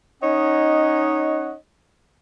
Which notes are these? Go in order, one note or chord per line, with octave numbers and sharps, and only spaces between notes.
C#4 D#4 C#5 D#5 F#5